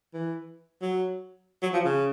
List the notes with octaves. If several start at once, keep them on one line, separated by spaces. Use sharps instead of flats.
E3
F#3
F#3
F3
C#3